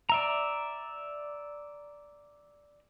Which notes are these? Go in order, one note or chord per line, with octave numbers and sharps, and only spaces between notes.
D5 E5 A#5